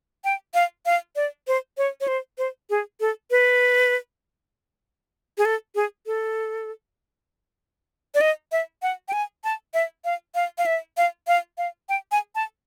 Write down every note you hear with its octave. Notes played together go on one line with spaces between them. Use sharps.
G5
F5
F5
D5
C5
C#5
C#5
C5
C5
G#4
A4
B4
G#4
A4
G#4
A4
D5
D#5
E5
F#5
G5
G#5
A5
E5
F5
F5
F5
E5
F5
F5
F5
G5
G#5
A5